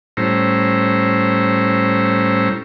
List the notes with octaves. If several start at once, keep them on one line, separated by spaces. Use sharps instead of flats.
A2 G3 C#4 E4 C5 A#5